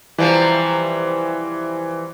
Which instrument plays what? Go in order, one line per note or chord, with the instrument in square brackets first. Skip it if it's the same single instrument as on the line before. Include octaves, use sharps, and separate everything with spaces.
[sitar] C3 F3 G3 [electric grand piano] E3